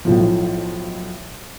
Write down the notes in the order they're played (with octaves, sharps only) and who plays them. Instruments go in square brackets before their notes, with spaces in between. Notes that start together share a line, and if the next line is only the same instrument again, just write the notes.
[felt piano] B1 A2 F3